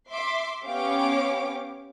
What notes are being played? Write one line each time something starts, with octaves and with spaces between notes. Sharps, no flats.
E5 C6 D6
B3 C#4 G4 C#5 F5 D6